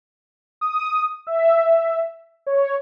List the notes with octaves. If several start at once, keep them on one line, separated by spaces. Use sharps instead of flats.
D#6
E5
C#5